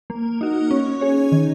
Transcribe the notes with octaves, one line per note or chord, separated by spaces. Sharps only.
A#3
D#4 F#4
C#4
G#4 C#5
D#3